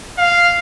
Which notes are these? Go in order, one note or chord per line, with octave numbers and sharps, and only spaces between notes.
F5